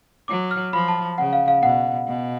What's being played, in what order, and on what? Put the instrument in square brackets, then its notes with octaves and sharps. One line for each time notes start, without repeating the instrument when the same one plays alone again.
[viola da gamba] F#3 [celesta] D6
[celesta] F6
[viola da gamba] F3 [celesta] B5
[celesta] A5
[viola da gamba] C#3 [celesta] F#5
[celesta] F5
F5
[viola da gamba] B2 [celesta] F#5
[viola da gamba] B2